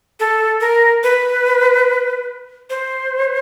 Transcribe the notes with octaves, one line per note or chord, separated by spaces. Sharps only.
A4
A#4
B4
C5